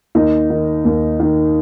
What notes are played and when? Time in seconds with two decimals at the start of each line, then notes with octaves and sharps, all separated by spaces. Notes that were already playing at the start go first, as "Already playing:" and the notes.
0.15 D#2 D#4
0.50 D#3
0.85 D#2
1.20 D#3